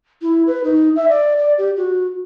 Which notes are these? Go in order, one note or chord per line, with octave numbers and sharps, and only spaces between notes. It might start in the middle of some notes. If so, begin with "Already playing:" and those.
E4
B4
D#4
E5
D5
D5
G4
F#4